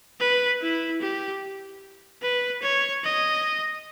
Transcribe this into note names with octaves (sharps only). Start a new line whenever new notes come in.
B4
E4
G4
B4
C#5
D#5